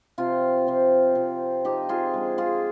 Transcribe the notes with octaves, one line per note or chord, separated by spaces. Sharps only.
C3 F3 C4 F4
C3 F3 C4
C3 F3 C4
C3 F3 C4 D#4 G4
F4 G#4
D3 F3 G#3
F4 G#4